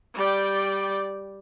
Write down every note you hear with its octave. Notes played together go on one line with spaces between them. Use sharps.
G3 D5 G5